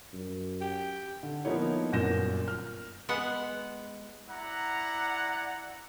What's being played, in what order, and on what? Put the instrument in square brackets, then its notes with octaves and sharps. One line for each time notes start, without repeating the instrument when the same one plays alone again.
[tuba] F#2
[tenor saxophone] G4
[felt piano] D3
F3 A#3 B3 D#4 E4 C#5
G1 F#2 A#2 G6 A#6 E7
F6
[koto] G#3 B3 F#5
[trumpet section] E4 D5 F#5 A#5